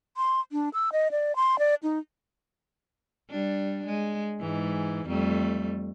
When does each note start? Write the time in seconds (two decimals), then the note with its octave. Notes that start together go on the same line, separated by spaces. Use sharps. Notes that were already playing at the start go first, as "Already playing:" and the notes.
0.17 C6
0.52 D4
0.73 E6
0.92 D#5
1.11 D5
1.36 C6
1.59 D5
1.83 D#4
3.30 G3 D4
3.86 G#3
4.41 G#2 E3
5.07 F2 G3 A3